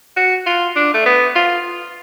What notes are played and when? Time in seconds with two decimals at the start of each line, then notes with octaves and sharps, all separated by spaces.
0.17 F#4
0.46 F4
0.76 D4
0.94 A3
1.06 B3
1.35 F4